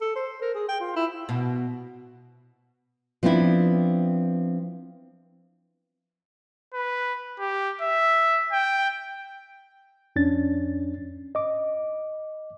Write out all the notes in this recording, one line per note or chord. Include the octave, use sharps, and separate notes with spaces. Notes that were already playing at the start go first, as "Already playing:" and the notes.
A4
C5
A#4
G#4
G5
F4
E4
B2
F3 B3 C4 D4 E4
B4
G4
E5
G5
F2 C#4 D4 A6
D#5 D6